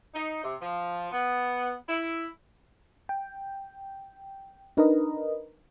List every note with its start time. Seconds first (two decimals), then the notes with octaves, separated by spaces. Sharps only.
0.14 D#4
0.44 C3
0.61 F3
1.12 B3
1.88 E4
3.09 G5
4.77 D4 D#4 A#4 B4 D#5